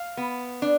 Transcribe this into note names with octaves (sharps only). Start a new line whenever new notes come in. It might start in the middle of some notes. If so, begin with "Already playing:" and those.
Already playing: F5
B3
D4